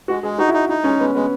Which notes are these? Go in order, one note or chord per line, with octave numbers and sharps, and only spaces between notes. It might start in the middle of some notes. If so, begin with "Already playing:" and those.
G#3 F#4
G#3 G#4
D#4 F#4
E4
D#4
D#4 E4
G#3 C#4
G#3 B3
G#3 B3